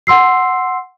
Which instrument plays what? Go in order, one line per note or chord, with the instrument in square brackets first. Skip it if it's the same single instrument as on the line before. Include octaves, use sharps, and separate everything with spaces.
[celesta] F#5 C6 E6 C7